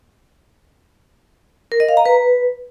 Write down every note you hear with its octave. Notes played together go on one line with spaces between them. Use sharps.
A#4
D#5
F5
A#5
B4